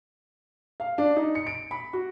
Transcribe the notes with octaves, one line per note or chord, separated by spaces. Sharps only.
F5
D4
D#4
C#7
D7
B5
F#4